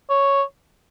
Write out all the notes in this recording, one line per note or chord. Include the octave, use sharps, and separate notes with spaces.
C#5